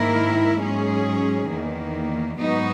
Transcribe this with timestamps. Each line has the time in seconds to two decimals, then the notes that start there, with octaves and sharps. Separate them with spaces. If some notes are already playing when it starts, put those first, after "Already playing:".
Already playing: G#2 D#3 A#3 E4 A#4
0.58 G#2 F#3 C#4 G#4
1.49 E2 D#3 A#3
2.38 G#2 F#3 B3 D#4 F#4